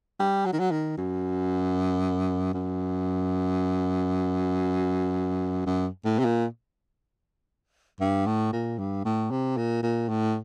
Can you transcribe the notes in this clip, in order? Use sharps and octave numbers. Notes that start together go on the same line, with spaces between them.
G3
F#3
D#3
F#3
D#3
F#2
F#2
F#2
A2
C3
A#2
G2
A2
A#2
G2
A2
C3
A#2
A#2
A2